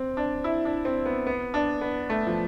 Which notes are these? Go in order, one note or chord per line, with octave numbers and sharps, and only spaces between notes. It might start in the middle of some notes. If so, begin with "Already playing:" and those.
Already playing: C4
D4
E4
D4
C4
B3
B3
D4
B3
A3
F3